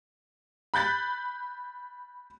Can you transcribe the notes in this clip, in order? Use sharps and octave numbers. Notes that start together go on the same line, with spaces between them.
B5 F#6 G6 A6 B6